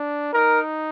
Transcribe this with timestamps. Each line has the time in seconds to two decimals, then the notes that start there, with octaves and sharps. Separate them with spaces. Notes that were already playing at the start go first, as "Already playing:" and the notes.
Already playing: D4
0.34 D#4 A#4